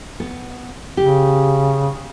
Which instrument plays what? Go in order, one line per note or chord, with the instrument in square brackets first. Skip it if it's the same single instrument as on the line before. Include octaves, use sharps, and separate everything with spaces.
[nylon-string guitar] B3
[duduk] C#3 [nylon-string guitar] G4